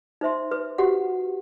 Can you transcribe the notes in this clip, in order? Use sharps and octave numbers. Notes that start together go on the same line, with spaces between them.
D#4 C5 E5 C6
B4
F#4 G4 F#5